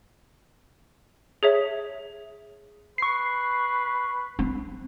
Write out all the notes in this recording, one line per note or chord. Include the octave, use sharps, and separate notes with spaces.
G#4 C#5 E5
B4 C#6 C7
C4